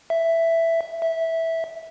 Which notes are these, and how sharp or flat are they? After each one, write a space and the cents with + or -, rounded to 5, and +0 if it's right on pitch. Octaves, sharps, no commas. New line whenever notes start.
E5 +5
E5 -10